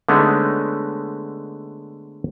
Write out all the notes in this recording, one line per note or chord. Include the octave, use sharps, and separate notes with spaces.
D3 G#3 A3 B3 C#4 D#4